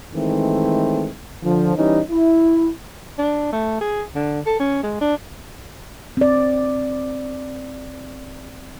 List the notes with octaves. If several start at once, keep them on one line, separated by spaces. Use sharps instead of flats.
D#3 E3 G#3 A3 C4
D3 F3
E3 G3 C#4 D#4
E4
D4
A3
G#4
D3
A4
C#4
G#3
D4
C4 D5